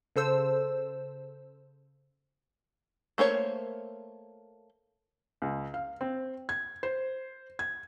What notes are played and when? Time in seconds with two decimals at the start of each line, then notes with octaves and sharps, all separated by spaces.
0.16 C#3 A4 C5 E6
3.18 A3 A#3 C5 C#5
5.42 C#2
5.74 F5
6.01 C4
6.49 G#6
6.83 C5
7.59 G#6